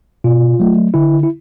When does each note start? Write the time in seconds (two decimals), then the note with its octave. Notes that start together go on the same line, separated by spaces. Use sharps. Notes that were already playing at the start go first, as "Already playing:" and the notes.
0.24 B2 F4
0.59 F#3 A3
0.94 D3 E4
1.23 E4